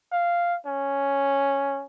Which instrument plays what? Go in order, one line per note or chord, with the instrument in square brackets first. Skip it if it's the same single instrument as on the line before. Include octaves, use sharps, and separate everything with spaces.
[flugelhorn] F5
C#4